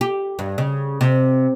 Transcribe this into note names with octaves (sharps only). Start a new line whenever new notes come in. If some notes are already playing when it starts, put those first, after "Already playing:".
G4
G2
C#3
C3